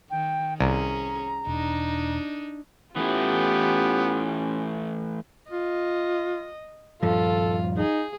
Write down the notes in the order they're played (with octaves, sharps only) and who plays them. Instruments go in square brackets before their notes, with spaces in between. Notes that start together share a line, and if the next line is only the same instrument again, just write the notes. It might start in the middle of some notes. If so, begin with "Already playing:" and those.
[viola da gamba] D#3 [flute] G5
[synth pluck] C2 [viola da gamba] C#4 G#4 [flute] A#5
[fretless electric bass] E1 [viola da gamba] D4 D#4
[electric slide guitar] E3 A3 E4 [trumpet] B3 [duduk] C#4 [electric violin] F4 G4
[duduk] F4 [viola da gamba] D#5
[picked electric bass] D#1 G2 F3 [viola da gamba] F4 [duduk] A4
[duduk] D#4 [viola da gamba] G#4